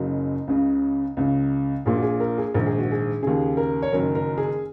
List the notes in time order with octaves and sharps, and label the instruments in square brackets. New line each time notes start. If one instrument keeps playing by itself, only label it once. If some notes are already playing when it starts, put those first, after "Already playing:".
Already playing: [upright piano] F#1 F#2 C#3 D#4
C#2 C#3
C#2 C#3
A#1 A#2 G#4
F#4
G#4
A#4
G#4
A#1 G#2 D#3 A#4
G#4
F#4
G#4
D#2 C#3 G#4
A#4
C#5
F#1 F#2 D#3 A#4
A#4
G#4